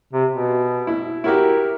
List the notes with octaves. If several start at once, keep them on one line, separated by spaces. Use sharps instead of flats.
C3
B2
E4
E4 F#4 G4 A#4